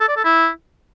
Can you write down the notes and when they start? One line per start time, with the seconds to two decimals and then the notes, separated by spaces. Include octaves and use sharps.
0.01 A4
0.09 D5
0.17 A4
0.25 E4